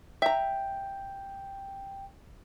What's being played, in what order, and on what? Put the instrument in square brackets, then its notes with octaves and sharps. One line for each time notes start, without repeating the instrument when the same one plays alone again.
[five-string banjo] E5 A#5 [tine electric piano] G5